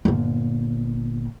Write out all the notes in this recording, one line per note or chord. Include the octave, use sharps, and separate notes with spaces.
G1 A#2